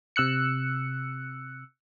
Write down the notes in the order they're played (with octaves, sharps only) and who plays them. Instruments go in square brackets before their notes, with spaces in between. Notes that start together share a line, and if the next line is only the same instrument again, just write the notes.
[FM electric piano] C3 E6 F#6 C#7